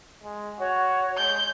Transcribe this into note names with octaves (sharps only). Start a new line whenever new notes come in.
G#3
F#4 C#5
G#3 G6